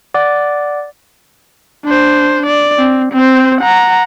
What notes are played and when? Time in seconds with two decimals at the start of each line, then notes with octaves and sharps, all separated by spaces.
0.14 D5 F#5 D6 A6
1.85 D4 C5
2.46 D5
2.79 C4
3.13 C4 C5
3.61 F#5 A#5